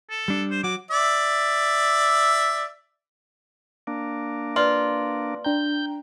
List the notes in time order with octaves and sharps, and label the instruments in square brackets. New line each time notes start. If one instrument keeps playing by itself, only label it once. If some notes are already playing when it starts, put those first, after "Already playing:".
[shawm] A4
[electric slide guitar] G3 D4
[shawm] C5
[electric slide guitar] F#3 F#4 [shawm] D6
[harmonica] D5 E5
[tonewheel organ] A#3 D4
[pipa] F4 [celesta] B4 D5 F#7
[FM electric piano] D4 G5 A#5 [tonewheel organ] G6